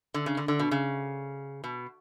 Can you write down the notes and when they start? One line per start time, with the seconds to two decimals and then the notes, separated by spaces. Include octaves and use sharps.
0.14 D3
0.26 C#3
0.37 D3
0.48 D3
0.59 B2
0.71 C#3
1.64 B2